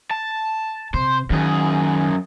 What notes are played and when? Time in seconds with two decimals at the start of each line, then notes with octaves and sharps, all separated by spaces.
0.11 A5
0.94 C3 C5
1.30 F#2 D#3 G#4